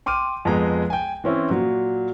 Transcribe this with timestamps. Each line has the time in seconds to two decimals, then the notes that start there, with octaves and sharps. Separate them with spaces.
0.06 G5 C6 D6 F6 D#7
0.45 F2 G#3 B3 G#4 A#5
0.90 G5 G#5
1.24 E3 C4 C#4 E4
1.50 A#2 F#3